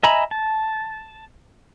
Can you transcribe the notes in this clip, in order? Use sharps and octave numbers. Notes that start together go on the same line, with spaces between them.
D#5 E5 G#5 A#5 B5
A5